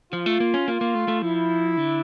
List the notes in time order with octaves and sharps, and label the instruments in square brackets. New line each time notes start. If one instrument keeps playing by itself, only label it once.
[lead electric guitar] F3 [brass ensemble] F4
[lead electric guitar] A3
A#3
C#4
[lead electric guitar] A#3 [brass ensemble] F4
[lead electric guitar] A#3
A3
A3
[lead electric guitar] F3 [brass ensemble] E4
[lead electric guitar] D3